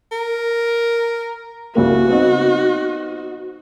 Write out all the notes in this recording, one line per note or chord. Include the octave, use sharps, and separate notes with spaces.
A#4
C2 C#3 A#3 F#4
B3 C4 D#4